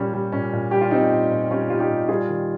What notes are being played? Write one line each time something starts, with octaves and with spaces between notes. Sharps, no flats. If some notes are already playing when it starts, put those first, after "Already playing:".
Already playing: A#2 G3 C#4
G3
A#2 C#4
A#2
G3 G4
F4
G3 C4 D#4
A#2
A#2
G3 C#4 F4
G3 F4
D#4 G4
A#2
G3 F4 G#4
D#3